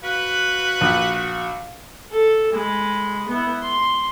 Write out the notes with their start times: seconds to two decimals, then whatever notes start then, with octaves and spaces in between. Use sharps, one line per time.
0.04 F#4 B4 F5
0.81 A#1
2.12 A4
2.53 G#3 B5
3.29 B3 E4
3.62 C6